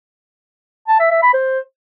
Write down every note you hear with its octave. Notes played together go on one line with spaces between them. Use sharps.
A5
E5
E5
B5
C5